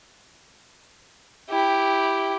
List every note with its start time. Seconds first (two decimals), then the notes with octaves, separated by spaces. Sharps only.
1.50 E4 G4